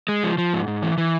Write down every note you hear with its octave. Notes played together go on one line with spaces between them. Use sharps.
G#3
F3
F3
G#2
G#2
E3
E3